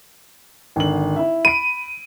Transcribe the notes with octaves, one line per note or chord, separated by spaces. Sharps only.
G#1 D3 F#7
E4 E5
B5 D7 D#7